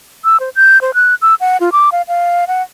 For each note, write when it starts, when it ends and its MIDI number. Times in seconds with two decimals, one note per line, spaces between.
0.24 0.37 88
0.40 0.49 72
0.56 0.81 91
0.81 0.91 72
0.94 1.15 90
1.22 1.35 88
1.40 1.57 78
1.60 1.70 65
1.72 1.90 86
1.92 2.02 77
2.08 2.45 77
2.48 2.62 78